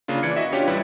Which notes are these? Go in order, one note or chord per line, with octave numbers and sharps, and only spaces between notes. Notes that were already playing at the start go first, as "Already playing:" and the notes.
C#3 A#3 D4 F4
E3 D5 G#6 C#7
E4 F#4 D#5 E5
C#4 D4 F4 G4 C#5
A1 G3 E4 B4